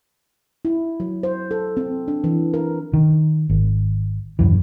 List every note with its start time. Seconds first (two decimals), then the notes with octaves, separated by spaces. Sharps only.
0.65 E4
1.00 F#3
1.23 C5
1.51 A4
1.77 C4
2.08 D4
2.24 E3
2.54 A#4
2.93 D#3
3.50 G#1
4.39 D#1 B1 F#2 E3